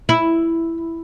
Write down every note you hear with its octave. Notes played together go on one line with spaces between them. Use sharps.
E4